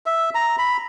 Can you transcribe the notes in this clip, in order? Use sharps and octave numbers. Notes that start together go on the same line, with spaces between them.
E5
A#5
B5